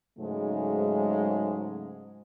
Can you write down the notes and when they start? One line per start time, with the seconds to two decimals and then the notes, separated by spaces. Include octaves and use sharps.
0.19 G#2 C#3 F#3 G#3 A3